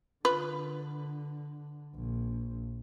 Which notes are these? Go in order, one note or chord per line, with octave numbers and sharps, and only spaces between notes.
D3 F4 B4
A#1